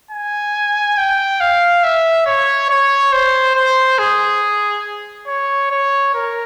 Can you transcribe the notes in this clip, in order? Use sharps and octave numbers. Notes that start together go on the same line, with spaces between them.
G#5
G5
F5
E5
C#5
C#5
C5
C5
G#4
C#5
C#5
A#4